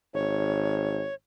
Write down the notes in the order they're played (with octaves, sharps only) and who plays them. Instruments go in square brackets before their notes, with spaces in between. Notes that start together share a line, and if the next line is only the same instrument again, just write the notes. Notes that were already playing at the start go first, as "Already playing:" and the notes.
[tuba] G#1 [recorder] C#5